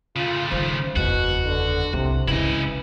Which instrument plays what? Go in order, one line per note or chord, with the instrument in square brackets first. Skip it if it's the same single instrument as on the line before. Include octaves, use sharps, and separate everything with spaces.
[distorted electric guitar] C#3 A3 [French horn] F4
[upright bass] D#3 G3 [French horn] C5
[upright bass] F#1 E2 [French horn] B2 [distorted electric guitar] F#4
[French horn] D3
[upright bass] C2 [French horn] C3
[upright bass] C#2 C#3 [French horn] E3 [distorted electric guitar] E4 D#5